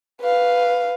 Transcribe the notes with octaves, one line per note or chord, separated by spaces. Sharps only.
B4 F5